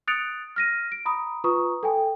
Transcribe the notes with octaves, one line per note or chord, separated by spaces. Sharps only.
D#6 F#6 A6 C#7 D7 F7
F6 A#6 D#7
D7
A#5 B5 D#6
F4 B4 A#5 C#6 D#6
A4 G5 G#5